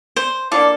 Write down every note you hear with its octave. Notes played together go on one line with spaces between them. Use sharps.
C5
A#3 D4 F4 A4 D5